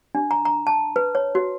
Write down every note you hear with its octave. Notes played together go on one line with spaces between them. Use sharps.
D4
A#5
A#5
A5
B4
C#5
F#4